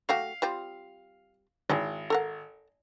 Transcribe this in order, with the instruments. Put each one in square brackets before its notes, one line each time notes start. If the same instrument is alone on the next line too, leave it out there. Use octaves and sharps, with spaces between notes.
[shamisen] A3 F#4 G4 [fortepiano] F5
[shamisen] G3 C4 F4
[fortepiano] G#1 [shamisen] G#3 E4
[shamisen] A4 A#4 F#5